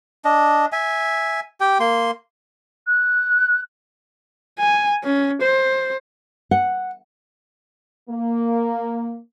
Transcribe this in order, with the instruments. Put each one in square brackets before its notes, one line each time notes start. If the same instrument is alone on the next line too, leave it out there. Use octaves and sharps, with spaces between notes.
[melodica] D4 D#5
E5 G#5
G4 G5
A#3 C6
[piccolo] F#6
[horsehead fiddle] G#5
C#4
C5
[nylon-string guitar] F#5
[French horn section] A#3